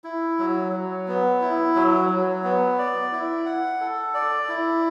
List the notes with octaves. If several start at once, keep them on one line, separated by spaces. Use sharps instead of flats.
E4
F#3
F#3
B3
E4
F#3
F#3
B3
D5
E4
F#5
A4
D5
E4